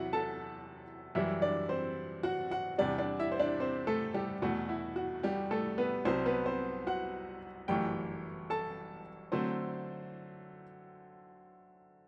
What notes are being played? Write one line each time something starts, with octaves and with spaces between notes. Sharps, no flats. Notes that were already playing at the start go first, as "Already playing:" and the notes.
Already playing: E2 C3 F#3 E4 F#4 E5 F#5
A4 A5
F#2 E3 G3 E4 E5
D4 D5
C4 C5
F#4 F#5
F#4 F#5
E2 C3 G3 D4 D5
D4 D5
E4 E5
C5
D4 D5
C4 C5
A3 A4
G3 G4
E2 B2 A3 F#4
E4
F#4
G3 G4
A3 A4
B3 B4
C2 C3 F#3 C4 C5
B3 B4
C4 C5
F#4 F#5
G1 F#2 E3 A3 G4 G5
A4 A5
D3 F#3 A3 C4 C5